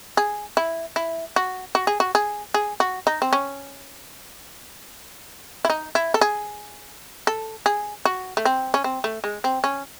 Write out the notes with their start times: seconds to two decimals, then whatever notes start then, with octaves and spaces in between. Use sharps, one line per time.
0.17 G#4
0.57 E4
0.96 E4
1.36 F#4
1.75 F#4
1.87 G#4
2.00 F#4
2.15 G#4
2.54 G#4
2.80 F#4
3.07 D#4
3.22 C4
3.33 C#4
5.65 E4
5.70 D#4
5.95 E4
6.14 A4
6.21 G#4
7.27 A4
7.66 G#4
8.05 F#4
8.37 A3
8.45 C4
8.74 C#4
8.84 C4
9.04 A3
9.24 G#3
9.44 C4
9.64 C#4